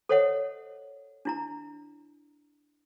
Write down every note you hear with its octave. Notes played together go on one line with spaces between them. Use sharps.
A4 C5 C#5 D#5 F#5
D4 E4 A#5